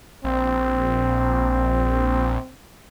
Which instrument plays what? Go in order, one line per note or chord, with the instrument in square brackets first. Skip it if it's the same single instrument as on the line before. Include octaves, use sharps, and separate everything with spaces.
[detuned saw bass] A#1 [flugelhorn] C4